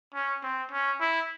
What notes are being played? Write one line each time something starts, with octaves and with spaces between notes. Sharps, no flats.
C#4
C4
C#4
E4